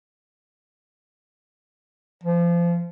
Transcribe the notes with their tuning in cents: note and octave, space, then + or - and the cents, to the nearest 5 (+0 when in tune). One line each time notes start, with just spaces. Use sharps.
F3 -25